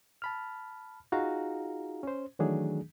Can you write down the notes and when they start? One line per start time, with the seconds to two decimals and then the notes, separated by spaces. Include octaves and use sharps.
0.22 A5 B5 F6
1.12 D#4 F4 F#4 G#4 F5 A#5
2.03 C#4 C5
2.39 D#3 E3 F#3 A3 D4 G#4